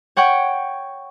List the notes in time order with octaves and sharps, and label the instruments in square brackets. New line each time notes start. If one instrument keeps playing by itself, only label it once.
[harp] C#5 F#5 G5 C#6 G#6